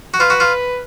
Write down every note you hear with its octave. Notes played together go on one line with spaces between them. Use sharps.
F#4
F4 B4
F#4
F4